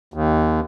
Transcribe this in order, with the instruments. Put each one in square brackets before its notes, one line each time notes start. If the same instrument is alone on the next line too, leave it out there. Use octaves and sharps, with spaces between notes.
[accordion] D#2